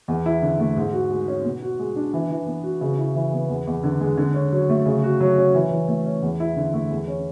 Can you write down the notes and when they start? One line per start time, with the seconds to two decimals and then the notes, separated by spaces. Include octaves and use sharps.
0.08 E2
0.26 E4
0.42 D3
0.60 A3
0.76 G#2
0.93 F#4
1.10 G#3
1.28 C#4
1.45 B2
1.62 F#4
1.79 G#3
1.96 D4
2.13 E3
2.31 E3
2.47 B3
2.64 F#4
2.81 C#3
2.98 E4
3.15 E3
3.33 B3
3.49 E2
3.67 E2
3.84 D3
4.01 G#3
4.18 D3
4.34 C#4
4.52 F#3
4.70 A3
4.86 C#3
5.03 F#4
5.21 F#3
5.38 C#4
5.54 E3
5.71 E3
5.89 A3
6.06 C#4
6.22 E2
6.40 E4
6.56 D3
6.74 A3
6.90 E2
7.08 C#4